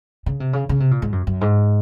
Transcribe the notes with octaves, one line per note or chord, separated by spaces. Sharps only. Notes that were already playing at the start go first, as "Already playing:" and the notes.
C#3
C3
C#3
C#3
C3
A#2
G#2
F#2
F#2
G#2